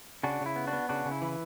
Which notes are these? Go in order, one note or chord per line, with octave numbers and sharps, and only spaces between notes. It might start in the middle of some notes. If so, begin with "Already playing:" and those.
C#3 D4 F#4
C#3
E4
B3
D4 F#4
B3
C#3 D4 F#4
C#3
E4
E3